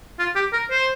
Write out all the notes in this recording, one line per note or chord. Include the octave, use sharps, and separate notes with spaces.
F4
G4
A#4
C5